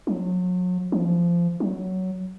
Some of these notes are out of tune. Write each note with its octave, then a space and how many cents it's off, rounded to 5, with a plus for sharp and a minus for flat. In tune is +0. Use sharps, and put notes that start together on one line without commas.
F#3 -35
F3 -20
F#3 +10